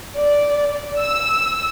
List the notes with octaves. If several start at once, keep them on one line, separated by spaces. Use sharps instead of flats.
D5
E6